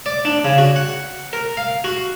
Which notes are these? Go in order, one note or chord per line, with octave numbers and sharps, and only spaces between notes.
D5
D4
C#3
F#4
F#5
A#4
F5
F#4